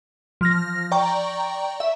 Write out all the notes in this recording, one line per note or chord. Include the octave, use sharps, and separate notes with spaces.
F3 F6 A#6
D5 G5 A#5 C#6
E5